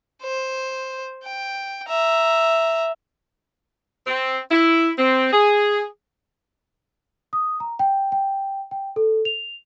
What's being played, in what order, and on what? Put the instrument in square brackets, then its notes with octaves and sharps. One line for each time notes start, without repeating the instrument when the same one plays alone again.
[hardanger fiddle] C5
G5
E5 A#5
[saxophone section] C4
E4
C4
G#4
[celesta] D#6
A#5
G5
G5
G5
A4
F7